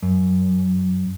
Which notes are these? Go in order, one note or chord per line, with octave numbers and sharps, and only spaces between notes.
F#2